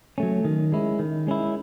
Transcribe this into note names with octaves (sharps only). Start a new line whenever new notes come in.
F#3 A3 C#4
D#3
G#3 C#4 E4
D#3
G#3 C#4 E4